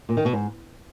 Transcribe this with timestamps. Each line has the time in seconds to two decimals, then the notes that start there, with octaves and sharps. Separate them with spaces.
0.09 A#2
0.17 D#3
0.25 B2
0.33 G#2